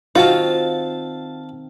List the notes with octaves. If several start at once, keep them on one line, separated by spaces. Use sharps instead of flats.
D#3 C4 F4 F#4 F5 A5